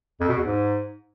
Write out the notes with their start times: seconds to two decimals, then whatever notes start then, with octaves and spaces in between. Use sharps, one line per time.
0.20 F2
0.29 B2
0.37 E2
0.45 G#2